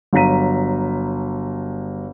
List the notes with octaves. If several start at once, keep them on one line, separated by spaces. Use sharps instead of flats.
G1 F#3 A#5 B6 D#7